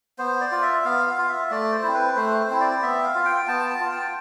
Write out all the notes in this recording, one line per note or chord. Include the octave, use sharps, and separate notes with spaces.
B3 C5
D5
F4
E5
B3 F5
F5
F4
E5
A3 D5
C5
C4 E4
B4
A3 C5
C5
C4 E4
D5
B3 E5
F5
F4
G5
B3 A5
A5
F4
G5